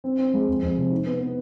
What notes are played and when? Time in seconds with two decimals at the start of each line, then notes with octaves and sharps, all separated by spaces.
0.04 C4
0.19 C4
0.33 G#3
0.48 F2
0.63 F2
0.77 C3
0.91 D#4
1.06 B3
1.20 B3